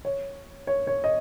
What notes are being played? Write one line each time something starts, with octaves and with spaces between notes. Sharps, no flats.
C#5
C#5
C#5
D#5